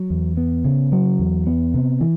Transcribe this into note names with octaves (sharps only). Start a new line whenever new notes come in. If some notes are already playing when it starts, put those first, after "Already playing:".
Already playing: F#3
E2
B3
C#3
F#3
E2
B3
C3
E3